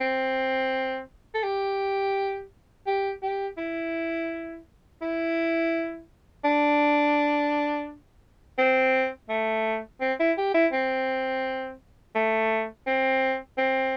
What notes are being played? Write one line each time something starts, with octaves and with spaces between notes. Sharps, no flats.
C4
A4
G4
G4
G4
E4
E4
D4
C4
A3
C4
E4
G4
E4
C4
A3
C4
C4